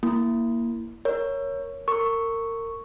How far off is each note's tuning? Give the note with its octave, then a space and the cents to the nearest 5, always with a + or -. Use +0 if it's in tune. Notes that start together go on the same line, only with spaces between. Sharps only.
A#3 +0 E4 +5
A#4 +0 C#5 +0
A#4 -30 C#6 +0